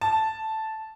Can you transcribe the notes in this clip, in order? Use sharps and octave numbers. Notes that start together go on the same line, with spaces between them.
A5